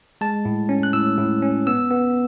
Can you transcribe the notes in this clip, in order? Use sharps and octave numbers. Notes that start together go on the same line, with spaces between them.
G#3 A5
A2
C#4
F#6
A2 E6
A2
C#4
B3 E6
B3